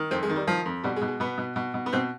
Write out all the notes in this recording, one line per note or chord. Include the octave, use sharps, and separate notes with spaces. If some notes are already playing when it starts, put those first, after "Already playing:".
Already playing: D#3
F2 C4
G#3
D#3
G3
D#3 F3
F2
B2 G3
G#3
B2
G#3
B2 B3
B2
B2
B2
B3
B2 C4